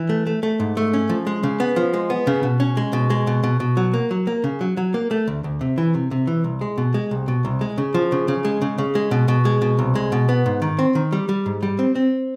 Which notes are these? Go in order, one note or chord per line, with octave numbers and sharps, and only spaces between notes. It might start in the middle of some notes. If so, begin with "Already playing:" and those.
Already playing: E3
A3
A3
A3
G#2
A3
C#4
F3
G#3
C#3
B3
F3
G#3
B3
C#3
B2
C#4
G#3
B2
G#3
B2
B2
B2
F#3
A#3
F#3
A#3
C#3
F#3
F#3
A#3
A3
D2
D2
C3
E3
C3
C3
E3
C2
G#3
B2
G#3
C2
B2
C2
G#3
C#3
F3
C#3
C#3
G#3
C#3
C#3
G#3
B2
B2
G#3
B2
C2
G#3
B2
B3
G#2
D#3
C4
D#3
G3
G3
G#2
G3
C4
C4